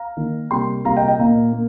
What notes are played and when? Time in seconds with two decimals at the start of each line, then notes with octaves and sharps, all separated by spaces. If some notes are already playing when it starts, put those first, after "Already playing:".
Already playing: F5 A#5
0.17 D#3 A#3
0.51 C3 G3 A#3 G5 C6
0.85 C3 G3 A#3 F5 A#5
0.96 D#5 G5
1.08 D#5 G5
1.19 A#2 A#3 F5 A#5
1.53 A#3